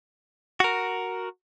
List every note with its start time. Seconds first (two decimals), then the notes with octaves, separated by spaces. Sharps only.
0.60 F#4 A#4